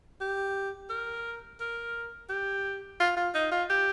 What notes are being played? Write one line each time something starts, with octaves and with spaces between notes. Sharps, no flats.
G4
A#4
A#4
G4
F4
F4
D#4
F4
G4